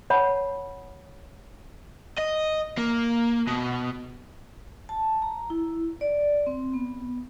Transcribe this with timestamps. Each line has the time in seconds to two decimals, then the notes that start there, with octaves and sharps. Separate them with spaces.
0.10 C#5 F#5 A5 B5
2.18 D#5
2.77 A#3
3.47 B2
4.89 A5
5.22 A#5
5.50 E4
6.01 D5
6.47 C4
6.74 B3